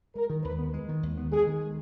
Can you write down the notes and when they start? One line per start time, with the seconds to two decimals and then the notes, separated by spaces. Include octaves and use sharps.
0.15 G#3 A#4
0.30 D#3
0.44 D#2 B4
0.59 B3
0.73 G#3
0.88 D#3
1.03 D#2
1.17 B3
1.32 G#3 G#4
1.47 D#3